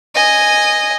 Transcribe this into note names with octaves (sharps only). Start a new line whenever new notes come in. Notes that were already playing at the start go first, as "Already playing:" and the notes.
D#5 G#5